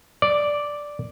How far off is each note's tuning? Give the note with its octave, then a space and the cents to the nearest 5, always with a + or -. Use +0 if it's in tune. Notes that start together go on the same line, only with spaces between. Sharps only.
D5 -5